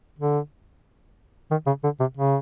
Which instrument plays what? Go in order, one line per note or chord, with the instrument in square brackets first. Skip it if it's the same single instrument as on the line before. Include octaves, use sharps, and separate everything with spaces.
[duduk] D3
D#3
C#3
D3
C3
C#3